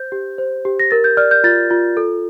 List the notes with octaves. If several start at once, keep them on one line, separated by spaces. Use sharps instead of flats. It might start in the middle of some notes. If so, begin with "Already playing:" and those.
Already playing: C5 G6
G4
C5
G4
A#6
A#4 A6
G6
D5 F6
G6
F4 A6
F4
A4